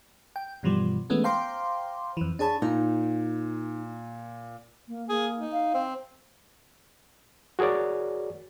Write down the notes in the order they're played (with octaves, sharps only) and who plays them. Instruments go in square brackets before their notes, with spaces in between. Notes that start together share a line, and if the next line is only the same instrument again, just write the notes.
[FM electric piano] G5
G2 B2 E3 F3 G3
E3 G#3 A3 B3 C#4
C5 F5 G5 A#5 C6 D6
F2 E3
D4 G#4 C#5 A5 B5
[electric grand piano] A#2 [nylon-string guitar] D#4
[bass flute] A#3
[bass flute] A#3 [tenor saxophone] G#4
[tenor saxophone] D#4
[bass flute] F5
[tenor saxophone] C4
[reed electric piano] F#4 G#4 A#4 C#5 D5